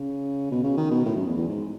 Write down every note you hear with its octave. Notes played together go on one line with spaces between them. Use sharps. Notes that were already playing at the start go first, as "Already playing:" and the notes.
Already playing: C#3
B2
C#3
D#3
B2
A2
F#2
E2
E2
G#2